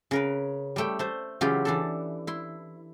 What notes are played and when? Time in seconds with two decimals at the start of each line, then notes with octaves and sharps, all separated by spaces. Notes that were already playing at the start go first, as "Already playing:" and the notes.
0.11 C#3 A#4 B4
0.76 G3 A3 G5
0.99 A3 C5
1.41 C#3 E3 F#3 F4 G4
1.65 E3 D4 A4
2.27 E4 C6